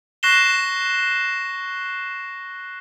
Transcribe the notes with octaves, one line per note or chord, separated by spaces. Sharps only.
C#6 F#6 A#6 C7 E7 G7